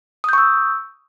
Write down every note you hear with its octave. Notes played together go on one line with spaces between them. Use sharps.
C#6 D#6 E6 G6